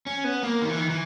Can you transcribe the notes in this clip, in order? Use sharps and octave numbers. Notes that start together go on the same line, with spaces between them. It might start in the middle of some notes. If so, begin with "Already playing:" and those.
C#4
B3
A#3
D#3
E3
D#3
E3